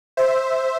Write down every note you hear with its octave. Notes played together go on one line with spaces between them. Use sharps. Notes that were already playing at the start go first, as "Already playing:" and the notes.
C5 E5